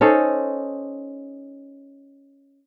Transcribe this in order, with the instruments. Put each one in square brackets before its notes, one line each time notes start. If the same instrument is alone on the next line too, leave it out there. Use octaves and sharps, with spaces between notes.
[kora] C#4 D#4 A4 C5